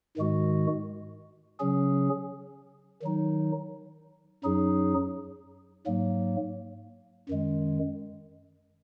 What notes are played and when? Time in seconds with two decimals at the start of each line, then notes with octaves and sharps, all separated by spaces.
0.17 G#2 D#3 G#3 F#4
1.60 C#3 F#3 C#4 G#4
3.02 D#3 F#3 D#4
4.44 F#2 F#3 D#4 G#4
5.87 G#2 F#3 A#3
7.29 F#2 D#3 G#3